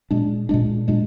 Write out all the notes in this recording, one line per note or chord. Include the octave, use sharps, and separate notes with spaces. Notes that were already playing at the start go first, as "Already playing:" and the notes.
A#2 G#3 D4
A#2 G#3 D4
A#2 G#3 D4